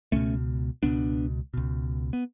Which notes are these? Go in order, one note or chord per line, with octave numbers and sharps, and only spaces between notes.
C#2 B2 A3 C#4
C#2 B2 B3 D4
C#2 B2
B3